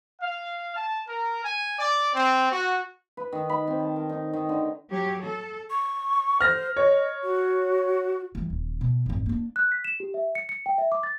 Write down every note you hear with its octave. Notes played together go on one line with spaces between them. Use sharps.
F5
A5
A#4
G#5
D5
C4
F#4
B4
D#3
B5
C4
A5
A#4
D#4
D#3
D3
F#3 G4 C#5
A4
C#6
C5 F6 A#6
C#5 D#5
F#4
E3 G3
D#1
B2
G#1 F2
A#3 D4
F#6
B6
E7
G4
E5
C#7
C#7
G5
E5
D6
A6